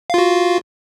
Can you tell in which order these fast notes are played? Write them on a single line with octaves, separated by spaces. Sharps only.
F5 F4 F#4